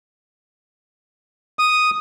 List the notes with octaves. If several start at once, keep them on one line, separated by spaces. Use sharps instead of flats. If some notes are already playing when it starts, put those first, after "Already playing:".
D#6